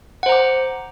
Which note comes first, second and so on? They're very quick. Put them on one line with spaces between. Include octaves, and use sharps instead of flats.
F#5 C5 A#5 D6